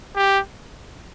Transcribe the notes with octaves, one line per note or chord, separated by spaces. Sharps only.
G4